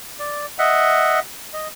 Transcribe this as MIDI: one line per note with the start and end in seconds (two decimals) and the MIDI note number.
0.19 0.46 74
0.59 1.20 75
0.59 1.20 76
0.59 1.20 78
1.53 1.68 75